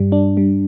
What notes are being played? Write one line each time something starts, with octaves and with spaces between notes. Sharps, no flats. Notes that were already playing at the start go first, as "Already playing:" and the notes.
Already playing: G2 G3
D4
G3